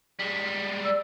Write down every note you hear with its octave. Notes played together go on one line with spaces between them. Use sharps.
G3 G#3
D5 E6